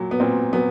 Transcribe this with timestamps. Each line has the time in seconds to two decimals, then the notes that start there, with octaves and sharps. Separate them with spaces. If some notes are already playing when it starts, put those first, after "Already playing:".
Already playing: A#2 F#3
0.11 B3
0.20 A#2 C4
0.53 F#3 B3